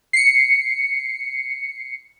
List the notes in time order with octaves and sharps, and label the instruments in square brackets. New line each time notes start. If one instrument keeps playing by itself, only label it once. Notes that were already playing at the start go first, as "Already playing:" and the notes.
[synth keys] C7 C#7